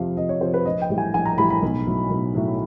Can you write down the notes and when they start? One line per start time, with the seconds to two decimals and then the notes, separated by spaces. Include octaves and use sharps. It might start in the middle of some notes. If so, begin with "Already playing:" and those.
Already playing: F2 C3 F3 F5
0.17 F2 D#5
0.29 C#5
0.41 C3 F3 C5
0.54 B4
0.65 A#1 D#5
0.82 G5
0.90 A2 E3 G3
0.98 G#5
1.14 A#1 G#5
1.25 A#5
1.38 A2 E3 G3 B5
1.50 B5
1.62 B1
1.87 A2 F#3
2.10 B1
2.35 A2 F#3